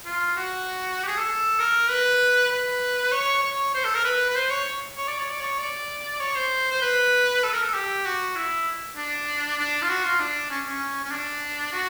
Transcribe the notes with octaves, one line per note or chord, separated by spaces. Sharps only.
F4
F#4
G4
G#4
A4
A#4
B4
B4
C#5
C#5
C5
A4
A#4
B4
B4
C5
C#5
C#5
D5
C#5
D5
C#5
D5
C#5
C5
C5
B4
A4
A#4
A4
G4
F#4
E4
D4
D4
F4
F#4
F4
D4
C#4
C#4
C#4
D4
F#4